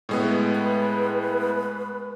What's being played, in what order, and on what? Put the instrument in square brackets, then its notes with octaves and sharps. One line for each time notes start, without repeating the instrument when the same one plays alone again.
[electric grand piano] A2 G#3 B3
[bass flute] B4